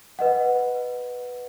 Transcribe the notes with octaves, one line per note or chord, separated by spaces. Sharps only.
B4 D#5 F#5